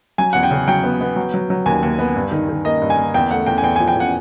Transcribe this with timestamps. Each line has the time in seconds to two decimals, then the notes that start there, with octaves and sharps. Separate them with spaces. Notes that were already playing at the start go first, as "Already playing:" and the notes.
0.18 F#3 G#5
0.33 E2 F#5
0.43 G5
0.51 C#3
0.68 F#3 G5
0.84 B3
1.01 B3
1.16 F#3
1.34 F#3
1.50 F#3
1.66 D#2 G#5
1.83 D#2
1.99 B3
2.16 G2
2.31 D#3
2.49 D#3
2.65 A#3 D#5
2.81 G2
2.90 G#5
2.97 A#3
3.14 E2 G5
3.31 A3 F#5
3.46 E2 G5
3.58 G#5
3.63 E2 G5
3.76 F3 G#5
3.88 G5
3.96 E2 F#5